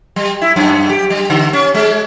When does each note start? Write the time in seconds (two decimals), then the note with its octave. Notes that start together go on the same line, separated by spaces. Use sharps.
0.16 G3
0.41 E4
0.56 F#2
0.89 G4
1.10 G3
1.30 D3
1.53 C#4
1.74 G#3